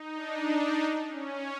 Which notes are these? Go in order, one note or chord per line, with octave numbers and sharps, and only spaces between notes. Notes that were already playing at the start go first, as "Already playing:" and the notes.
Already playing: D#4
D4
D#4
D#4
C#4